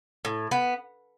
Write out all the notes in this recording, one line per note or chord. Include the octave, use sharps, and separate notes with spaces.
A2
B3